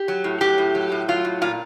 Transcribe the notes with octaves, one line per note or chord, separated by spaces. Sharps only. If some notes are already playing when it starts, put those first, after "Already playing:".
Already playing: G4
F#3
A2
F#3 G4
A2
F#3
A2
F#3 F4
A2
A#2 F4